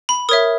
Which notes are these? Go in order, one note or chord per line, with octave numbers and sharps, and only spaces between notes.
B5
A#4 C#5 E5 D#6